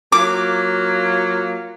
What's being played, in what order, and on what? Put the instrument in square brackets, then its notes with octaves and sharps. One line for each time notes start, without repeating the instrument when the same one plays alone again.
[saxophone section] F#3 A#3 F4 [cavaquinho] D6